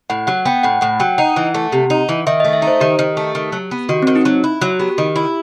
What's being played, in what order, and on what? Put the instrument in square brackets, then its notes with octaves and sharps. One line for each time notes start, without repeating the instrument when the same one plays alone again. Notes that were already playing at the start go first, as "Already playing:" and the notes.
[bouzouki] A2 [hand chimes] F#5
[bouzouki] F#3 [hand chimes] F#5
[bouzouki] B3 [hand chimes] G5
[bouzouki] A2 [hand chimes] F#5
[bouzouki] A2 [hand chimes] F#5
[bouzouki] F#3 [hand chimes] G5
[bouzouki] D#4 [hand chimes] F#5
[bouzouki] E3
A3
C3
D#4
E3
[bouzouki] D#3 [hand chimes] E5
[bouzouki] A3 [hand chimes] D#5
[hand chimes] E5
[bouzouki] D#4
[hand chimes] C5
[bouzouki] D#3 [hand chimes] G4
[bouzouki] D#3
A3
D#3
F#3
B3
[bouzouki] D#3 [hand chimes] F#4
[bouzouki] D#3 [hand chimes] C4
[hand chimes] D#4
[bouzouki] F#3
E4
[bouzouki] F#3 [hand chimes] F#4
[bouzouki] B3 [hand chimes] G4
[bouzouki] D#3
E4